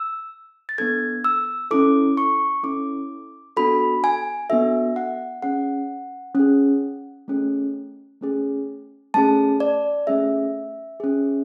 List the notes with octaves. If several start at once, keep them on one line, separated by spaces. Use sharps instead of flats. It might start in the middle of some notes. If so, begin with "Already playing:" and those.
Already playing: E6
A6
B3 D4 A4 G#6
E6
C#4 E4 A4 D6
C#6
C#4 E4 A4 D6
B3 D4 F#4 A4 B5
G#5
B3 D4 F#4 A4 E5
F#5
C#4 G#4 F#5
C#4 G#4
A3 C#4 G#4
A3 C#4 G#4
A3 C#4 G#4 A5
D5
A3 C#4 G#4 E5
C#4 G#4